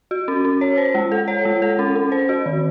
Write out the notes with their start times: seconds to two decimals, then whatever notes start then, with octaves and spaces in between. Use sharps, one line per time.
0.11 F#4
0.28 C#4
0.45 C#4
0.61 C#5
0.78 C5
0.95 G#3
1.12 A4
1.28 C#5
1.45 G#3
1.62 A4
1.79 C#4
1.95 C#4
2.12 C5
2.29 F#4
2.46 D#3